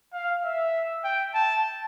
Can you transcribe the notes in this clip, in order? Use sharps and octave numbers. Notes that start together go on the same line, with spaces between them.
F5
E5
G5
A5